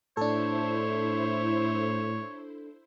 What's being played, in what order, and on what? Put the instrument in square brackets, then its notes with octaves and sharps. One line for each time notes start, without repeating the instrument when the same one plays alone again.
[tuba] A2 [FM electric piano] D4 A4 [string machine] E4 C5 [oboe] C#5